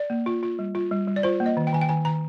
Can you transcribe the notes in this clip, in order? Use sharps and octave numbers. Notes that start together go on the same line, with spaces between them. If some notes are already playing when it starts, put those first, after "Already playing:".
Already playing: D5
A#3
F4
F4
G3
F4
G3
G3
D5
F4 C5
A#3
D#5
D#3
G5
D#3 G#5
G5
D#3 G#5
D#3 A#5